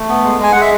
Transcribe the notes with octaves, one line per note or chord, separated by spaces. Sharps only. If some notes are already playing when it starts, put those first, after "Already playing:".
Already playing: A3
B3
G#3
G#3 G#5
G#3 F#5
E5